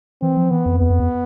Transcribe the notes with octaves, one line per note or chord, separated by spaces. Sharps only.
E3 C4
F3
E3 B3
F2
E2 B3
F2
E2